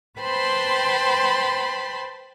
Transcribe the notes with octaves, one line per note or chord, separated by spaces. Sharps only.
B4 C5 G5 A5 B5 C6